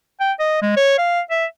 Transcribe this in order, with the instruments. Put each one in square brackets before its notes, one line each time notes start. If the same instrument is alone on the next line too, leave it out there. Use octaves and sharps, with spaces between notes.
[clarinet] G5
D#5
G#3
C#5
F5
E5